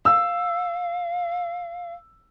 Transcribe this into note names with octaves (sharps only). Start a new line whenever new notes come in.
F5 E6